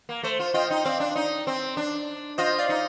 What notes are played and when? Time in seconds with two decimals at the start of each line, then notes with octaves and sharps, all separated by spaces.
0.09 A#3
0.23 A3 C5
0.39 F4
0.54 F4 D#5 G5
0.70 D#4
0.76 D#5
0.85 C4 D5 F5
1.00 D4
1.16 D#4
1.47 C4
1.77 D4
2.38 F4 C5 D#5
2.58 D5 F5
2.69 D#4